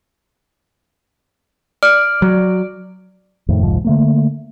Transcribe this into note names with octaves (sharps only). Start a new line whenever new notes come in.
D5 F6
F#3
F2 A2 D#3
F1 C2 G#2 F3
D3 A3 A#3